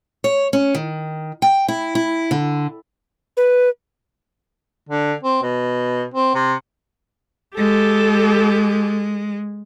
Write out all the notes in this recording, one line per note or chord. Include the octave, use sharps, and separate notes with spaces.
C#5
C#4
D#3
G5
E4
E4
D3
B4
D3
C4
B2
C4
C3
G#3 G4 A4